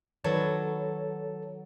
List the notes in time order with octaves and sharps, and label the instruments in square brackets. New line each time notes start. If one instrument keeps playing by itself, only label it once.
[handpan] D#3 B4 D5 [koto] F#3 [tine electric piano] A4 A5